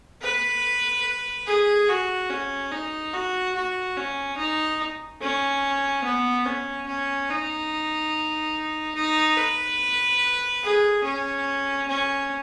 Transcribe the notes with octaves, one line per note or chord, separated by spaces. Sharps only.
B4
G#4
F#4
C#4
D#4
F#4
F#4
C#4
D#4
C#4
B3
C#4
C#4
D#4
D#4
B4
G#4
C#4
C#4